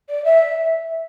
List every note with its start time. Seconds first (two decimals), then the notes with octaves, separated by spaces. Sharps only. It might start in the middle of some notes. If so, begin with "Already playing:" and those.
0.09 D5
0.25 E5